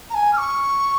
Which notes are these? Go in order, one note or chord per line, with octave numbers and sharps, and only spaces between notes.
A#5
G#5
F6
C#6